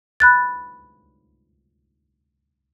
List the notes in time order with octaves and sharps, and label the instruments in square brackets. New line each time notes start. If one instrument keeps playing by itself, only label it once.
[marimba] B5 F#6 A6